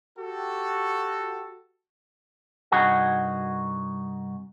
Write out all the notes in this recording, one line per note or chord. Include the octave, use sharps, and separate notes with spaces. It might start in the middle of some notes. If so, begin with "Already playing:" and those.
F#4 G4 A4
C2 G2 D#4 F#4 G#4 F#5